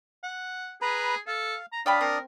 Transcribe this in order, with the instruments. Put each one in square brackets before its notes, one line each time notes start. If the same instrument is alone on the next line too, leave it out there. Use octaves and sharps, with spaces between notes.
[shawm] F#5
[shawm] G#4 [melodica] B4 A#5 B5
[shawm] A4 [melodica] F5
[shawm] A#5
[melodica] D4 D5 D#6 [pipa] C#5 G5 B5 [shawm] F5
[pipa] C4 [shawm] A#4